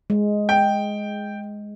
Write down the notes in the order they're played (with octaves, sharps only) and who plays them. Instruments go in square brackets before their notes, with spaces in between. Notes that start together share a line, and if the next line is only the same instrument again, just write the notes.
[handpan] G#3
[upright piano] G5